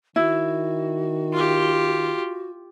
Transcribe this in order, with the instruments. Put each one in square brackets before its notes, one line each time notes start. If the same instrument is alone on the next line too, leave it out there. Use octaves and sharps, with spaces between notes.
[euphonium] D#3 [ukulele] E4 [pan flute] F#4
[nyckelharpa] F4 G4